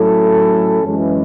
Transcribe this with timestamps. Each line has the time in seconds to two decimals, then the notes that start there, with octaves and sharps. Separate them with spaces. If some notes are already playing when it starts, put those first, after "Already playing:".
Already playing: A2 F#3 C#4 E4 A4
0.83 F#2 E3 G#3 C#4